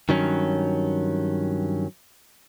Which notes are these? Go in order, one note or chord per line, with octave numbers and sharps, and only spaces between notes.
G2 D#3 F#3 C#4